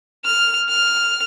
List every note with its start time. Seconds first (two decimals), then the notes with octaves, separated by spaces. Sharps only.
0.25 F6
0.69 F6